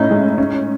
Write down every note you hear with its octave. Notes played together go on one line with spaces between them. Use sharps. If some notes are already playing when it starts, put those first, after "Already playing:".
Already playing: A2 C#4 D#4 E4
G#3
C#4